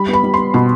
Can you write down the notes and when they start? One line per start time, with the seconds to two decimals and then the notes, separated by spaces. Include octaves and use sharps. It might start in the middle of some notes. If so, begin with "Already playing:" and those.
Already playing: G3 B5
0.08 B3
0.13 B5
0.24 G3
0.34 B3 C6
0.54 B2 B5